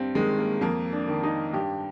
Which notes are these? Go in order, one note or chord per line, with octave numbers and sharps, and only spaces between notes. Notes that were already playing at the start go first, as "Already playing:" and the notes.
Already playing: G2 C4
D#3 G#3
A#3
F2 A#3
D4
D#3
D#4
G2 G4